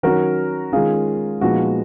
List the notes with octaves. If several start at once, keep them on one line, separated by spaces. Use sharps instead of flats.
D#3 F#3 C#4 F#4 A#4
D#3 G#3 C#4 F4 G#4
A#2 F3 G#3 B3 D#4 F#4